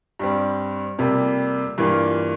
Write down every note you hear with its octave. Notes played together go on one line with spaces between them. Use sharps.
G2 G3 C4
F2 C3 G3 A#3
G2 E3 A#3 F4